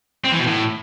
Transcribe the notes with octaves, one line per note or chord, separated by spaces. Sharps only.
C4
E3
B2
A2